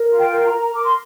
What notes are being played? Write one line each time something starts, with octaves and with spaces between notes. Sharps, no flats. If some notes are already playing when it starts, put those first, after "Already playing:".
Already playing: A#4
F4
G5
A#4
A#5
A#4
A#4 D6
C6